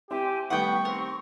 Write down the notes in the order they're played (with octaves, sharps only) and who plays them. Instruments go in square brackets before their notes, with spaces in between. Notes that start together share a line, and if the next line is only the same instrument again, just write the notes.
[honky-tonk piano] C4 E4 [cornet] G4 [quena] G#5
[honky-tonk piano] D#3 G3 A3 [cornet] B3 [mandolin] F#5 G5 [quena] C#6
[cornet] C4 [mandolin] A#4